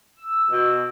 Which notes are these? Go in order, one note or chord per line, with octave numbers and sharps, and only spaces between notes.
E6
B2